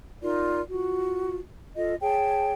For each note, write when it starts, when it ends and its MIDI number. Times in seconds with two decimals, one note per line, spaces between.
0.22 0.60 63
0.22 0.60 65
0.22 0.60 70
0.22 0.60 74
0.71 1.38 65
0.71 1.38 66
1.76 1.95 65
1.76 1.95 69
1.76 1.95 75
2.01 2.53 68
2.01 2.53 73
2.01 2.53 79
2.01 2.53 81